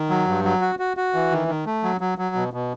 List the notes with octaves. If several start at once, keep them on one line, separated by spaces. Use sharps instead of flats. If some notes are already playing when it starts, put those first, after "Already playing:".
Already playing: D#3
F#3
G2
F#3
F#4
F#4
F#4
E3
D#3
D#3
A3
F#3
F#3
F#3
B2
B2